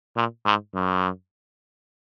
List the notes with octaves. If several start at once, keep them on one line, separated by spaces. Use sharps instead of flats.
A#2
G#2
F#2